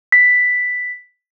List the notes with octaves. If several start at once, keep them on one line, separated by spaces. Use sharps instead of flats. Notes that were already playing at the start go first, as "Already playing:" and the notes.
B6